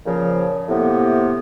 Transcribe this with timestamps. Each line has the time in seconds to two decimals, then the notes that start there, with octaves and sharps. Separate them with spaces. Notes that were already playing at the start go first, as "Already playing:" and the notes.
0.06 A#2 C#3 F3
0.69 A2 C3 A#3 B3